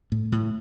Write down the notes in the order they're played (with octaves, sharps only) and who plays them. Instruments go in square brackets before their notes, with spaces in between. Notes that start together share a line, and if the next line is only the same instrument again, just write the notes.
[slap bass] A2
A2